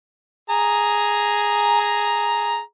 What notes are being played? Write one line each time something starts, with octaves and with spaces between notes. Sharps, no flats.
G#4 A#5